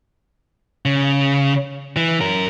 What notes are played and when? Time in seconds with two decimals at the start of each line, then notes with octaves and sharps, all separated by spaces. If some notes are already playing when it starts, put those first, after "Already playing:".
0.85 C#3
1.96 E3
2.21 F#2 A#4